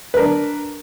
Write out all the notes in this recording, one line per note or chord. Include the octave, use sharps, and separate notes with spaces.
D4 A#4 B4